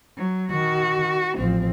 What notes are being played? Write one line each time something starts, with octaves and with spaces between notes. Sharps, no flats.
F#3
D#3 F#4
A1 F3 C4